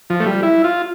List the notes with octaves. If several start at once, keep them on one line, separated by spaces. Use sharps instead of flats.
F3
A3
G3
E4
F4